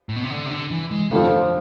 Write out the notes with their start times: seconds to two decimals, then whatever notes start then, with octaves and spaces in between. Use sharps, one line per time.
0.09 A2
0.16 B2
0.24 C3
0.30 D3
0.46 C3
0.51 D3
0.71 E3
0.91 G#3
1.11 F2 D3 F3 A3